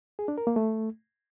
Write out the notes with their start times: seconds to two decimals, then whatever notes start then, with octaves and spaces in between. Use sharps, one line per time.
0.19 G#4
0.28 D4
0.38 A#4
0.47 A#3
0.56 A3